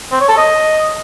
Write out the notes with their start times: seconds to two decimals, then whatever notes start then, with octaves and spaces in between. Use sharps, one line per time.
0.12 C4
0.21 C#5
0.29 A4
0.37 D#5